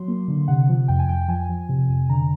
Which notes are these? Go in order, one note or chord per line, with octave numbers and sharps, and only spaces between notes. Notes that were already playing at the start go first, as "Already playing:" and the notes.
Already playing: F#3 C6
A#3
D3
C3 F#5
F3
F2 G5
G#5
F2 G5
F3 G#5
F3
C3
F2
D3 A#5